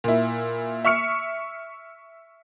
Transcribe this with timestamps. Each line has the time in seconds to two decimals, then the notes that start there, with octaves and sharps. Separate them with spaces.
0.04 A#2 E4
0.85 E5 C#6 F6 C#7